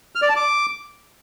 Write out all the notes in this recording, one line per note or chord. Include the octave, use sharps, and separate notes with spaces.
F6
D5
A5
D6